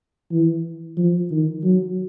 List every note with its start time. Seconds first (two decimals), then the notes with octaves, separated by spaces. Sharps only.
0.31 E3
0.97 F3
1.31 D#3
1.63 F#3